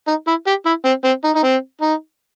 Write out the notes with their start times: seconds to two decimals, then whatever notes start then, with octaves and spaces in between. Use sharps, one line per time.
0.08 D#4
0.28 E4
0.47 G4
0.66 E4
0.85 C4
1.05 C4
1.25 D#4
1.36 D#4
1.44 C4
1.82 D#4